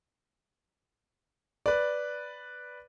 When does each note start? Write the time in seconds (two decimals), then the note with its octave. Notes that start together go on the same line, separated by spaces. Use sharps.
1.66 B4 D5